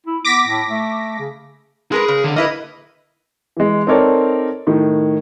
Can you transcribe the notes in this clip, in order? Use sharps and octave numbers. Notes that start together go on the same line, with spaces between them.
E4
B3 D6 A#6 B6
A2
A3
C#3
G#3 G#4 A#4 B4
C#3
D3
A#3 E4 B4 D#5
E3 G#3
C4 D#4 A4 A#4 C#5 D5
A2 D#3